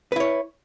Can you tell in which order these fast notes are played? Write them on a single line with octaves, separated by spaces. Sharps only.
B4 E4 C#5